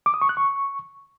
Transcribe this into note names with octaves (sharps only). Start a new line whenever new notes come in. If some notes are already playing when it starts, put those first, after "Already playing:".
D6
D#6
C#6
F#6
C#6